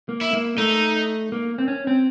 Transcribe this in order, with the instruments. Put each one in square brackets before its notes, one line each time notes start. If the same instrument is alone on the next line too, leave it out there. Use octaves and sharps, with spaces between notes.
[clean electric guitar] A#3
[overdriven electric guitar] E4
[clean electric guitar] A#3
[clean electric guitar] A3 [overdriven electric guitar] D#4
[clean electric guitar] A#3
C4
C#4
C4